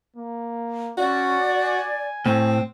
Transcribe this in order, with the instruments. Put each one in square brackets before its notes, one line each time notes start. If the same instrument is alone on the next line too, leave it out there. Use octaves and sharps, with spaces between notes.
[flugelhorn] A#3
[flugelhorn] C#4 [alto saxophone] F#4 [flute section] D5
[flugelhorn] G#5
[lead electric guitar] A2 [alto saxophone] C4